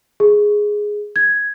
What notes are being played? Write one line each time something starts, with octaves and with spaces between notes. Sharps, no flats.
G#4
G#6